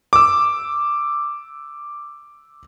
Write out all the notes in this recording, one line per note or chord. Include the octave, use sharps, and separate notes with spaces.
D6 E6